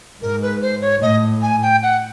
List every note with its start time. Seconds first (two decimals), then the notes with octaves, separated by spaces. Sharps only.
0.21 G#2 A#4
0.42 B4
0.62 C5
0.82 C#5
1.02 A2 D#5
1.42 G#5
1.63 G5
1.83 F#5